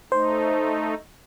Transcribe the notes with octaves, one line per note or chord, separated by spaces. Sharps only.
A3 D#4 C5